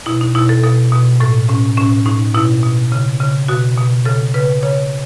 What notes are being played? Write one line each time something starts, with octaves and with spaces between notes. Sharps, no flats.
B2 E4
D#4
B2 E4
A4
B2 A4
B2
A2 A4
A2 C#4
A2 C#4
A2 D#4
B2 E4
B2
C#3
C#3
B2 F#4
B2
C#3 A4
C#3 B4
C#3 C#5